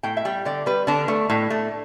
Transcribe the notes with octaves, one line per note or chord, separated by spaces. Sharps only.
A2 G5
E5
G3 G5
D3 D5
G3 B4
D3 D4
A3
A2
A3